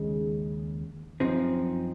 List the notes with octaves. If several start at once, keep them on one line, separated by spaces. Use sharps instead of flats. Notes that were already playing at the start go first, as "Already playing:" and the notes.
Already playing: D#2 C#3 G#3
F#2 F3 C4 D#4